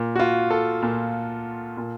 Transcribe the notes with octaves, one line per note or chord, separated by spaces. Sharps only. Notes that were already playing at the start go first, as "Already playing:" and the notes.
Already playing: A#2
F#4
F4
A4
A#2
A#2